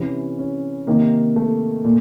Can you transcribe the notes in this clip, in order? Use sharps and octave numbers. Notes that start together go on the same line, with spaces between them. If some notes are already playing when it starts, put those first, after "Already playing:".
Already playing: C3 E3 C#4
C#4
C3 D#3 A#3
A3
A#2